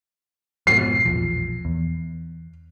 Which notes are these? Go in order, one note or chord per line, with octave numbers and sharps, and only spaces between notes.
F2 G#2 B2 C7
E1 A#1 F3
E2